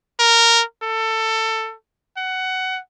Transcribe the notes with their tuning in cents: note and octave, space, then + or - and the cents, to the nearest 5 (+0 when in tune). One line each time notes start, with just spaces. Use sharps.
A#4 -10
A4 +20
F#5 +15